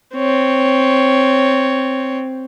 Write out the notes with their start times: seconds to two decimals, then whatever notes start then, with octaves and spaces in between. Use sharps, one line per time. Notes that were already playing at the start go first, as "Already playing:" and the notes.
0.15 C4 C#5